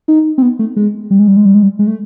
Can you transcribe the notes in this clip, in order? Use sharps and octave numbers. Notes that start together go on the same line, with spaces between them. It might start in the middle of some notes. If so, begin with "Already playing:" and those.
D#4
C4
B3
A3
G#3
G3
G#3
G3
G#3
G3
G#3
G3
G#3
A3